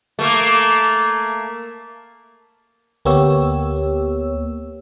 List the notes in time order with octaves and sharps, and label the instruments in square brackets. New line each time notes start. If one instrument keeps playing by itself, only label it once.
[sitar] A3 A#3
[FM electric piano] D2 A#3 B3 G4 C#5 E6